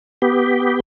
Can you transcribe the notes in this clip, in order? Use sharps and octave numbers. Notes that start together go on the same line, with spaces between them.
B3 G4